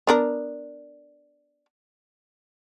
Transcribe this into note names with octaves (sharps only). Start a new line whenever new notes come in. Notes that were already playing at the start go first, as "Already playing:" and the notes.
B3 D4 A#4